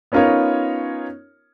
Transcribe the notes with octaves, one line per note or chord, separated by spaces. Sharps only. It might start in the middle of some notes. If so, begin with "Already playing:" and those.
B3 C#4 D#4 F4 A#4 C#5